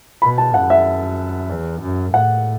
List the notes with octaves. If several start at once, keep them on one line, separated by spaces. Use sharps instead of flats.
B2 B5
A5
F#2 F#5
E5
E2
F#2
A2 F#5